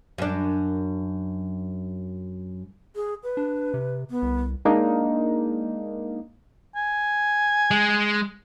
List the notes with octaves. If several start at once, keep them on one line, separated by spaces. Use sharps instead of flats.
F#2 D4
G#4
B4
D4
C3
B3
C2
G#3 A#3 D4 D#4
G#5
G#3